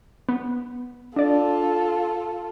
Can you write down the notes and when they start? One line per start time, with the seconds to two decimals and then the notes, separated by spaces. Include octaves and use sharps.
0.29 B3
1.16 D4 F4 A4 D5